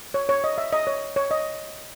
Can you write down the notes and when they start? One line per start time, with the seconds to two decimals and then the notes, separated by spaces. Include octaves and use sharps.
0.14 C#5
0.29 C#5
0.44 D#5
0.58 E5
0.73 D#5
0.87 C#5
1.16 C#5
1.31 D#5